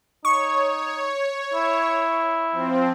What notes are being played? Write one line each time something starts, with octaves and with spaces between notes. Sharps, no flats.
D#4 C#5 C#6
E4
F3 C4